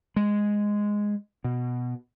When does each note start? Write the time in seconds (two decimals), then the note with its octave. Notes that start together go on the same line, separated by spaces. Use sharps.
0.16 G#3
1.44 B2